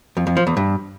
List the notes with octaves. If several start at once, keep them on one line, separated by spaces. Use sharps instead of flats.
F2
F2
F3
E2
G2